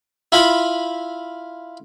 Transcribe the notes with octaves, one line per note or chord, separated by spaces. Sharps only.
E4 F4 B5